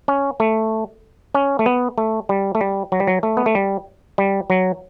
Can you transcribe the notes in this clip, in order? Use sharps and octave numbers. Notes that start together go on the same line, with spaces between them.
C#4
A3
C#4
A3
B3
A3
G3
A3
G3
F#3
G3
F#3
A3
B3
A3
G3
G3
F#3